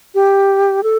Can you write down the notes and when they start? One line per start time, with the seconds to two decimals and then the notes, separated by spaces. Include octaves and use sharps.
0.15 G4
0.83 A4